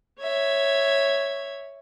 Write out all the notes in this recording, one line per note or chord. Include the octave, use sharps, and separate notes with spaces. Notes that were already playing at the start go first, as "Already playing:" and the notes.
C#5 E5 G#6